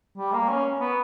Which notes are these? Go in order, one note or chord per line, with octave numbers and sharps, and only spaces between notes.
G3
A#3
C#4
B3